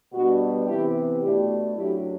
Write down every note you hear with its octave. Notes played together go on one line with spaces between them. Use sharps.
B2 G3 B3 D4 F#4
C3 E3 B3 E4 G4
B2 A3 D4 E4 G4
F#2 F#3 A3 D4 E4 G4